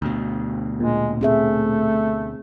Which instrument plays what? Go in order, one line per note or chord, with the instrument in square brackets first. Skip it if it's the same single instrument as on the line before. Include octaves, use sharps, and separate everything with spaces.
[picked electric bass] D2 B2
[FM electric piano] A#2 [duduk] G#3
[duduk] A3 [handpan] C4 G#4 E5